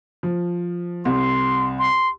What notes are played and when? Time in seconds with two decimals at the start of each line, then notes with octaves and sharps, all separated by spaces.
0.23 F3
1.05 C2 C6
1.79 C6